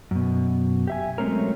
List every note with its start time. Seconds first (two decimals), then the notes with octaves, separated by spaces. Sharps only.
0.11 F#2 B2
0.87 G4 E5 G#5
1.18 F#3 G#3 A3 C4 C#4 A#4